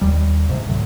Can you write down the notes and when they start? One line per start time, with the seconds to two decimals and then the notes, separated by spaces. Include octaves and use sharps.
0.01 D#2 G3
0.47 C2 G#2 C3
0.67 D2 A2 F#3